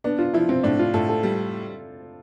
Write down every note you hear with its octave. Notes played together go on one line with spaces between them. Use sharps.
B3 D4
F4
F3 E4
C4
A2 D4
F4
A2 A4
A4
G3